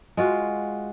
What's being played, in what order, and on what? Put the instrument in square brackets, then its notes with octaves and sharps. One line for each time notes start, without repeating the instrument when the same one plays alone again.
[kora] G#3 F4 F#4